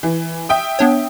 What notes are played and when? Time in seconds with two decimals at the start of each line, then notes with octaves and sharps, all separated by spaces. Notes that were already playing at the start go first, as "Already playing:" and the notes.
0.03 E3
0.49 E5 G5 D#6
0.79 B3 D4 C#5